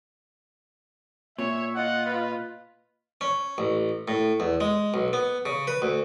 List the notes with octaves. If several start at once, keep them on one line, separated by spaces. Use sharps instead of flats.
A#2 C#5 E5
F4 D#5 F#5
B4
C#4
A1
A2
E2
G#3
B1
B3
C#3
B4
D2